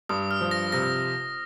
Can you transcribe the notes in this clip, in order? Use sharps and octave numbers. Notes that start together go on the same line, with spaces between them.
G2 D#6
F6
F3
A#6
C3 A#6